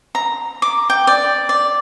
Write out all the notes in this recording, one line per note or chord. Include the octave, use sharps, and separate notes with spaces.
A#5
D6
G5
D5
D5